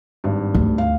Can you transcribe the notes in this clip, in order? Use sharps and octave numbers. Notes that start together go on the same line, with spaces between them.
G#1 G2
D2
F5